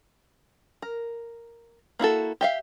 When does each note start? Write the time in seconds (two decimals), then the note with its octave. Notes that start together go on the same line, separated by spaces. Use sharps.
0.82 A#4
1.99 A#3 E4 F#4 A4
2.41 G4 E5 F5